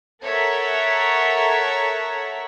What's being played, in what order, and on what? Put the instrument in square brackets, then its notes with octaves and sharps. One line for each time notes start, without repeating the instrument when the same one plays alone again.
[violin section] A4 A#4 C#5 E5 F#5